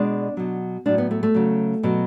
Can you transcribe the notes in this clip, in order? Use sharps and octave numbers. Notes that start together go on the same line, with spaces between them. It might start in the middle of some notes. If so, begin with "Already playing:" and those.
Already playing: B2 G#3 D4
B2 F#3
A2 F#3 D4
B3
A3
A3
C#3 F#3
B2 F#3